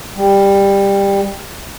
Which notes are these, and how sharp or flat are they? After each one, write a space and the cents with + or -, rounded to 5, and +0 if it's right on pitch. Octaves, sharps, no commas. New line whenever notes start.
G3 +15